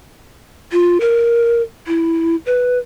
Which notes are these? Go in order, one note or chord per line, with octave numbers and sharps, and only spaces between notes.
F4
A#4
E4
B4